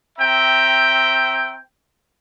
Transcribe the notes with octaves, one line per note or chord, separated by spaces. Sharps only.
C4 E5 G5 A#5